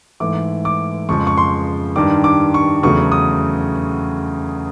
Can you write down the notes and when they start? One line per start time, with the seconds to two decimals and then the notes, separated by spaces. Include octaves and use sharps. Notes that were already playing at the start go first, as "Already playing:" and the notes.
0.20 G#2 E3 A3 D6
0.65 D6
1.09 F2 C#3 F3 G#3 C#6
1.27 C#6
1.37 C6
1.96 G2 D#3 G3 D6
2.24 D6
2.54 C#6
2.83 E2 C#3 F#3 A3 C#6
3.12 D#6